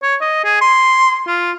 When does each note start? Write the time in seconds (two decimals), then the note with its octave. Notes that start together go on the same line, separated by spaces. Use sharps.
0.03 C#5
0.21 D#5
0.44 G#4
0.61 C6
1.27 F4